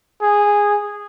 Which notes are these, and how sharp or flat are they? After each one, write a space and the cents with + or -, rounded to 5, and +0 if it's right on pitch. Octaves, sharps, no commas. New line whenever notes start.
G#4 -10